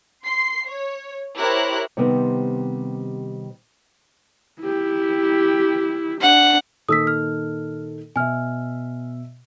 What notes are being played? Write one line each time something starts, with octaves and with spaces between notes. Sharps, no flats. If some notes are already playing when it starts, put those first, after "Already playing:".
C6 C7
C#5
E4 G4 A#4 C5 C#5 F#6
C3 D#3 G3 B3 C4
E4 G4
D4 F#5
A#2 D#3 A4 D#6 E6 B6
F6
B2 E5 G#5 F6